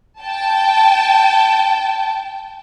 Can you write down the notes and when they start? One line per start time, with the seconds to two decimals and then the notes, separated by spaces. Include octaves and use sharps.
0.19 G5 A5